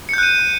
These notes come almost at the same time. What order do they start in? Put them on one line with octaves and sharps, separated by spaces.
C#7 G6 F#6 D#7